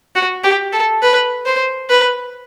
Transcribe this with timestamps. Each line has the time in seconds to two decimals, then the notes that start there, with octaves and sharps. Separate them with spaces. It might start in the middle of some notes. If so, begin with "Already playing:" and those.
0.15 F#4
0.44 G4
0.73 A4
1.02 B4
1.46 C5
1.90 B4